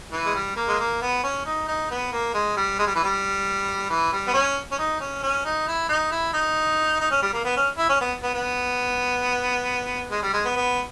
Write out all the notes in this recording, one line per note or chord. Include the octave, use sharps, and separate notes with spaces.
E3
G#3
G3
A#3
G#3
A#3
B3
C#4
D#4
D#4
B3
A#3
G#3
G3
G#3
G3
E3
G3
E3
G3
B3
C#4
C#4
D#4
C#4
C#4
D#4
E4
D#4
E4
D#4
D#4
C#4
G3
A#3
B3
C#4
E4
C#4
B3
B3
B3
G#3
G3
G#3
B3
B3